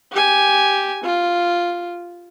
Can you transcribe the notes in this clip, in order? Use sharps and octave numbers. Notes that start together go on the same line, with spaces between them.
G4 G#5
F4